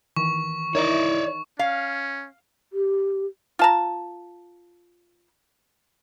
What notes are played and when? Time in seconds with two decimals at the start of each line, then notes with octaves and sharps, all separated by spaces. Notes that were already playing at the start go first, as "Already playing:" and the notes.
0.16 D#3 E3 C#6
0.75 D#4 E4 A#4 C#5 D5
1.59 C#4 F5
2.73 G4
3.59 F4 A5 A#5